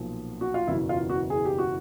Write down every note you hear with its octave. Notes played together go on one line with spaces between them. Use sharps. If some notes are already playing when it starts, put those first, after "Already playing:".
Already playing: B1 A#2 F3
F#4
F4
F#1 E2 B2 E4
F4
F#4
G#4
G4
F#4